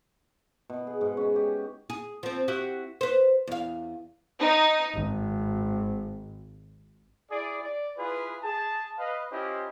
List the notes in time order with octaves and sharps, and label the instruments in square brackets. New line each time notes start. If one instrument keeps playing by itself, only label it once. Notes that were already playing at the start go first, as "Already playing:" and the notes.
[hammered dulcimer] B2
G#4
G#2
C#4
G4
[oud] G#4
F3 C4
E4 F#4 G4
B4 C5
E2 F5
[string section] D#4
G#1
[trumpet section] E4 G#4 D5
D5
E4 F4 G#4 B4
G#4 A5
B4 D#5 F5
C#4 E4 F4 G4 C5 D#5